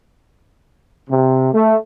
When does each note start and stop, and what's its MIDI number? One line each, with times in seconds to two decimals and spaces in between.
1.10 1.48 48
1.53 1.77 57